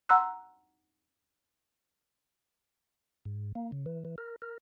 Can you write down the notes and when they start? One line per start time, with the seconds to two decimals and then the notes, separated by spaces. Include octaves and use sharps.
0.09 F#5 A#5 C6 E6 F#6
3.25 G#2
3.55 A#3
3.72 C#3
3.86 E3
4.05 E3
4.18 A#4
4.42 A#4